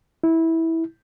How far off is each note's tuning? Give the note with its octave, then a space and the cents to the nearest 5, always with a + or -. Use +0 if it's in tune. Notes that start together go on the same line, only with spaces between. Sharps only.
E4 -15